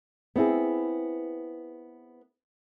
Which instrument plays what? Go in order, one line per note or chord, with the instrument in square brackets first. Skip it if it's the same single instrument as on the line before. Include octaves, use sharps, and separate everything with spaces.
[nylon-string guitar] B3 C4 E4 G#4